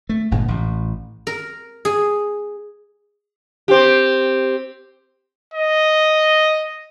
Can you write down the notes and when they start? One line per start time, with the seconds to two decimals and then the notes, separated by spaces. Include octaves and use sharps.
0.09 A3
0.31 G1 A#2 C#3 G#3
0.48 A1 A2
1.27 A#4
1.85 G#4
3.68 C4 G4
5.54 D#5